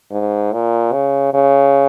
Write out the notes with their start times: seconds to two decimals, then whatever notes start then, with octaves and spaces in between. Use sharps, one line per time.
0.11 G#2
0.53 A#2
0.93 C#3
1.34 C#3